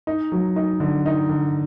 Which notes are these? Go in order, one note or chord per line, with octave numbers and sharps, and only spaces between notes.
D#4
F#3
D#4
D3
D#4
D3